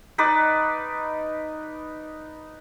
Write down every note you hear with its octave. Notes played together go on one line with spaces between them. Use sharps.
D#4 B4 D5